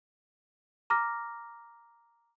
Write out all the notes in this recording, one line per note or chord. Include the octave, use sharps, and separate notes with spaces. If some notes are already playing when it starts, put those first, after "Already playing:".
A#5 D6 F6 A#6